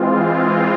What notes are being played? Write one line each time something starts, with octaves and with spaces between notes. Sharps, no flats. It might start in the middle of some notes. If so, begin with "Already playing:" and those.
Already playing: E3 G#3 C4 F4